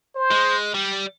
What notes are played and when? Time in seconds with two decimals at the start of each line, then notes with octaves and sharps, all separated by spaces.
0.16 C5
0.31 G#3
0.74 G3